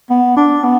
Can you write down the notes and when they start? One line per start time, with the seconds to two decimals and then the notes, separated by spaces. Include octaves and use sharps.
0.10 B3
0.36 D4
0.64 B3